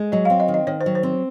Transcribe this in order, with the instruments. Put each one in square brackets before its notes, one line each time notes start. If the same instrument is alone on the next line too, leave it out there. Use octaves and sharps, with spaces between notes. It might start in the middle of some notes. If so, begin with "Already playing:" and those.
Already playing: [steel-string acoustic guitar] G#3
[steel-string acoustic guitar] F#3 [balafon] D#5
[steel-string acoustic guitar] C4 [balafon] F5
[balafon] D#5
[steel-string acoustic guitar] D#3
[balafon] D#5
[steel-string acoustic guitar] D#3 [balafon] C#5
[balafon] C5
[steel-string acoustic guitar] F#3
[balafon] C5
[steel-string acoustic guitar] C4